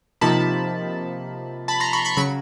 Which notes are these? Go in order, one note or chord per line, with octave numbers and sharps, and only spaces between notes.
C3 F3 A#3 D#4 A5 B5
A5 B5
A#5 C6
B5 C#6
B5 C#6
C#3 F#3 B5 C#6